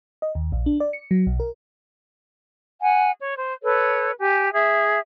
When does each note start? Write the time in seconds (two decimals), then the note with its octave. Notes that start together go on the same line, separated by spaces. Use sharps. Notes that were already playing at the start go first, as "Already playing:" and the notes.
0.22 D#5
0.35 D#2
0.52 A#1
0.66 D4
0.80 D5
0.93 C#7
1.11 F#3
1.27 B1
1.40 A#4
2.81 F#5 G#5
3.19 C#5
3.34 C5
3.63 A4 B4 C#5
4.20 G4 G#5
4.54 G#4 E5